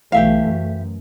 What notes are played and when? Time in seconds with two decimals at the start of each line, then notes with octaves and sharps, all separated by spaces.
0.12 B1 E3 A3 G4 E5 F5
0.46 F#2